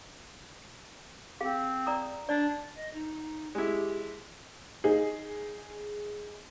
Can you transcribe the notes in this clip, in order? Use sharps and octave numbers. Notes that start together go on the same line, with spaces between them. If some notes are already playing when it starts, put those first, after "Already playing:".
C4 G#4 F5
D5 A#5 D#6
D4 D5
D#5
D#4
G#3 E4 G4
D#4 G#4